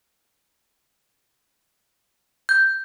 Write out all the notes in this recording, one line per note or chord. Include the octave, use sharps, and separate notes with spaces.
G6